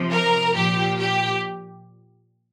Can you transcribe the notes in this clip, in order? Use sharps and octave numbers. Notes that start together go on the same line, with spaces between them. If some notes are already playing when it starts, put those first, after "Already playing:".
Already playing: C3 F3
A#4
A#2 F3 G4
G4